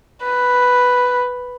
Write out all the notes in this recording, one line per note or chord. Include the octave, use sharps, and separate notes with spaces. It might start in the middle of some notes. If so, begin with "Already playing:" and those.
B4